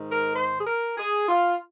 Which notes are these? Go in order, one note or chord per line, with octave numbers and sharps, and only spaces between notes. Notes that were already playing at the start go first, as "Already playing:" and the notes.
Already playing: G#2 D#3
A#4
C5
G#4
A#4
G#4
F4